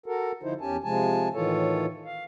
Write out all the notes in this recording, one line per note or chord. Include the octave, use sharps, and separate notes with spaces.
F#4 A4 A#4
D3 F3 D#4 E4 C5
E2 C#4 G4 G#5 A5
C3 F3 G#3 G#5 A5
A2 D#3 E3 F4 A4 C#5
F5